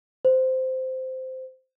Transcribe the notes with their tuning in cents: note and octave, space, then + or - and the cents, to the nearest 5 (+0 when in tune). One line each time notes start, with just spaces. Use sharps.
C5 -10